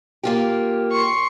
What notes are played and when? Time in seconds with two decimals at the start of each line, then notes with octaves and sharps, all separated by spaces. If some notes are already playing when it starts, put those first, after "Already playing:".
0.23 A#3 F4 G4
0.91 C6 C#6